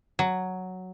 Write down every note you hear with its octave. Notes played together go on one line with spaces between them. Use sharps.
F#3